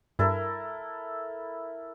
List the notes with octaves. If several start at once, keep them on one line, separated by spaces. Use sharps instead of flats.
G2 E4 A4 A#4